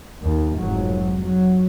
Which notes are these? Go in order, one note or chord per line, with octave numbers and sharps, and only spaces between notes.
D#2
F1 G#2 F#3
F#3